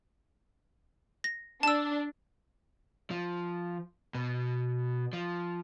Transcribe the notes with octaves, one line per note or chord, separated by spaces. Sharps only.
A#6
D4 A5 E6
F3
B2
F3